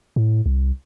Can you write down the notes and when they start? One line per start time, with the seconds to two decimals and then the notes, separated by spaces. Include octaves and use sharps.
0.16 A2
0.46 C2